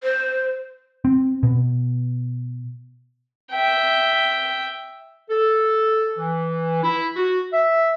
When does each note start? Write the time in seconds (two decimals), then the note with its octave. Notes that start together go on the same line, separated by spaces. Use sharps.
0.04 C5
1.05 C4
1.43 B2
3.52 E5 G5
5.30 A4
6.18 E3
6.83 E4
7.17 F#4
7.53 E5